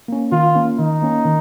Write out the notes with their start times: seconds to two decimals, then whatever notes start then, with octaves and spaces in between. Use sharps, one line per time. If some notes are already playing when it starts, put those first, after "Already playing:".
0.08 A#3 C#4
0.32 D#3 F4
0.55 A#3 C#4
0.78 D#3 D#4
1.02 A#3 C#4
1.25 D#3